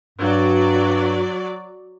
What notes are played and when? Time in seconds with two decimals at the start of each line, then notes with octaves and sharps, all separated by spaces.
0.19 G2 F#3 D5